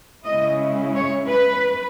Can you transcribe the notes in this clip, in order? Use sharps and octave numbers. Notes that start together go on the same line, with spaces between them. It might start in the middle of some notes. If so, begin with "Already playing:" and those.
C#3 G#3 C#4 E4 D#5
C#5
B4